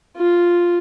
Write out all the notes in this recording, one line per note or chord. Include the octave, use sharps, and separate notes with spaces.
F4